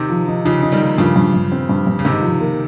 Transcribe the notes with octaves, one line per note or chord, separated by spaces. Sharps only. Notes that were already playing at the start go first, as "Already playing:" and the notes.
Already playing: C3 D#3
F3
D#4
C#3 F3 D#4
D#4
D#3 G3
A#3
G2 C#3 F3
G2
G2
C4
G2
G2
C#3
G#2 C3 D#3
F3
A#3